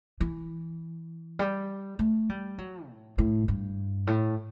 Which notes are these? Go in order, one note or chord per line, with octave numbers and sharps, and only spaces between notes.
E3
G3
A3
G3
F#3
A2
A2
G2
A2